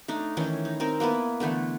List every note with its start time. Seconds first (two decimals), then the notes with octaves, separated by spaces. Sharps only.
0.08 A3 D4 D#4
0.37 D#3 E3 C#4 A4
0.65 D#4
0.80 C4 D#4 A#4
1.00 A#3 B3 E4 B4
1.40 D3 E3 A3 B3